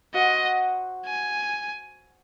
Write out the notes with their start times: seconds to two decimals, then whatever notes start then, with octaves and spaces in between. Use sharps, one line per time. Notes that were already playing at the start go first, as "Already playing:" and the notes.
0.14 F#4 C5 D#5 F#5
1.06 G#5